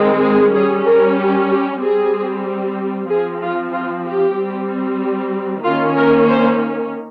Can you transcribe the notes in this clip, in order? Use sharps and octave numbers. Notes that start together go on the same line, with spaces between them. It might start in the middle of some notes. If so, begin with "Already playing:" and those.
Already playing: D#3 G#3 C4
G#4
G3 C#4 G#4
A#4
G4
G4
G3 C4 G#4
F3 C4 G#4
F4
F4
G4
G3 C4
D#3 A#3 C#4 F4
A#4
C5